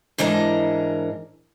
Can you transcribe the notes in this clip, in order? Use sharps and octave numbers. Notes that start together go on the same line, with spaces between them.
G#2 E3 D4 A#4 D#5